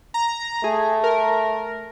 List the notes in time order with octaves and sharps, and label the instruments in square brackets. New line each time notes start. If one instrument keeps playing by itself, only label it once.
[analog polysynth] A#5
[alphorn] A3 [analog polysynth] G#4
[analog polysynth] A#4